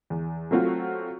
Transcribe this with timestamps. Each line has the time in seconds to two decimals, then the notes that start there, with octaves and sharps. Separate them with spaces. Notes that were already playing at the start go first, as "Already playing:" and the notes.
0.10 E2
0.51 F#3 A3 C4 F4 F#4